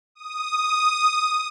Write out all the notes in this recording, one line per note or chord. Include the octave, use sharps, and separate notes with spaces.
D#6